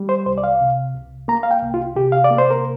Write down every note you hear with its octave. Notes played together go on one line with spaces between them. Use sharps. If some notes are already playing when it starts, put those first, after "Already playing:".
Already playing: G3
C5
C2 C5
D5
F5
C3
C2
A#3 A#5
F5
G5
C2
F4
C3 G4
F5
D5
A#3
C5
A#4